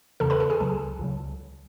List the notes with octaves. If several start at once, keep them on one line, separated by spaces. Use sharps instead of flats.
E2 C#3 E3 A4 A5
B4 B5
A4 A5
G#4 G#5
C#2 C#3 F#3 A4 A5
C#2 C#3 F#3